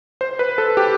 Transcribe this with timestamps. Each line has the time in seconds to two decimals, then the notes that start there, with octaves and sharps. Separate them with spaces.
0.21 C5
0.39 B4
0.58 A4
0.77 G4